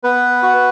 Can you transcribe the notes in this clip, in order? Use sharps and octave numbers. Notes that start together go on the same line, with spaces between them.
B3 B4
F#4